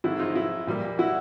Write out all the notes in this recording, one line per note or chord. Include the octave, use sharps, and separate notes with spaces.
G#2 D#3 G#3 C4 E4
D#4 F4
E4
A#2 G3 A#3
E4 F#4